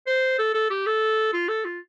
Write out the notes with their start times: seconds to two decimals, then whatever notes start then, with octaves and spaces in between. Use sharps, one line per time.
0.07 C5
0.39 A4
0.55 A4
0.71 G4
0.86 A4
1.33 F4
1.49 A4
1.65 F4